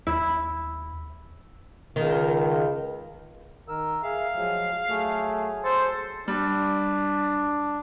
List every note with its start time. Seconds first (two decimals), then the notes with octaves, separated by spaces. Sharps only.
0.07 D#2 E4
1.96 C#2 D#3
3.68 D#3 A#4 E6
4.03 G#4 E5 F5
4.35 F3 F#3 G#3
4.89 F#3 A3 G#4
5.64 A4 C5
6.28 G3 D4